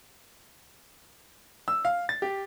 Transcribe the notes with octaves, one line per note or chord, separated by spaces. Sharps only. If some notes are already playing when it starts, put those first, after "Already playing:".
E6
F5
A6
G4